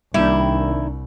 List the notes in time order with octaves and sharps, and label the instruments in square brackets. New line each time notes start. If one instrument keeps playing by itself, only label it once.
[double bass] C2 [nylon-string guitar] D#3 A#3 D4 [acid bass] G3 [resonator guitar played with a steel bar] E4